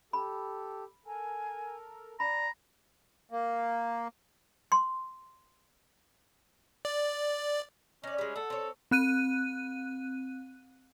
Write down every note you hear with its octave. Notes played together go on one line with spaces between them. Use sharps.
G4 A4 B5
A4 A#4 G#5
D5 A#5 B5
A#3
C6
D5
C#4 D#4 D5
G3 G#3
A4 F#5
C4 C#5
C4 F#6 D#7